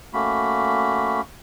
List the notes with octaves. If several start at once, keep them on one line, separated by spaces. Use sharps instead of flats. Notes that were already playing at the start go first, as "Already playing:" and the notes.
A3 A#3 C#4 F#4 B5